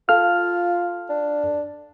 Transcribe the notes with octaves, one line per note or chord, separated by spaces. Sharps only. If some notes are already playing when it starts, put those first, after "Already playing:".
F4 A4 F5 F6
D4